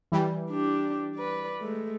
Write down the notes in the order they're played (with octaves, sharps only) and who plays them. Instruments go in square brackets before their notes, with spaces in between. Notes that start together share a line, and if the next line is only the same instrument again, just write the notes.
[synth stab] E3 G3
[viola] D4 G4
B4 D5
G#3 A3